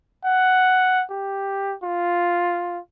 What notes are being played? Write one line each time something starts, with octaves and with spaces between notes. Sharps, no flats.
F#5
G4
F4